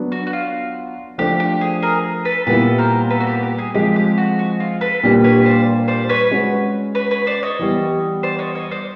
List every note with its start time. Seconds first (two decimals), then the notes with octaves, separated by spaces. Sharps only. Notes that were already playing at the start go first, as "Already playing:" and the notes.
Already playing: F#3 B3 D4
0.12 F#4
0.27 F#4
0.33 F4
1.18 F3 A3 D4 G4
1.40 G4
1.61 G#4
1.82 G#4 A#4
2.25 A4 B4
2.46 A#2 G3 B3 E4 A4 B4
2.78 A#4 C5
3.10 A4 B4
3.20 F#4
3.27 G4
3.43 G4
3.58 G#4
3.74 F3 G#3 C4 G4
3.96 G4
4.17 F#4
4.39 F#4
4.60 F4
4.81 A4 B4
5.03 A#2 G3 A#3 D4 G4
5.24 B4 C#5
5.45 C5 D5
5.88 C5 D5
6.09 B4 C#5
6.31 G#3 C#4 F#4
6.95 B4 C#5
7.11 B4 C#5
7.27 C5 D5
7.43 C#5 D#5
7.59 E3 G3 B3
8.23 C5 D5
8.39 C#5 D#5
8.55 C#5 D#5
8.71 C5 D5